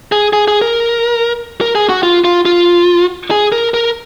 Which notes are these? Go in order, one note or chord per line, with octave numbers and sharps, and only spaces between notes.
G#4
G#4
G#4
A#4
A#4
G#4
F#4
F4
F4
F4
G#4
A#4
A#4